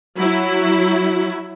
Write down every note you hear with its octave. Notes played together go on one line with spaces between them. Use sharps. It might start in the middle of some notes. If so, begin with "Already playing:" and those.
F#3 E4